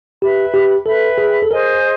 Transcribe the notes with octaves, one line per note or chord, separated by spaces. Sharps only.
G4 B4 E5 G5 B5
G4
A4 B4 E5 G5 B5
G#4
A4
G#4 A#4 C5 D#5 G#5